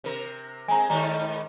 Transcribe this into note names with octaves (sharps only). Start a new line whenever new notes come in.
C3 A#4
G#3 C4 G#5 A#5
G#2 D#3 G3 A#5